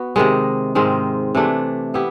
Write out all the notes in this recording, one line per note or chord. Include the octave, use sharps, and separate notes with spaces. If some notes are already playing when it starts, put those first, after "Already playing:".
Already playing: B3 F#4
C3 D#3 G#3
G#2 D#3 G#3 C4
C3 E3 A3 D4
B3 E4 G4